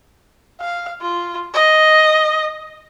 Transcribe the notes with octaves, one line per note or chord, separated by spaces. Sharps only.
F5
F4
D#5